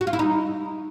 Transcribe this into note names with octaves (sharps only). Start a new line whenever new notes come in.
F#4
F4
E4
D#4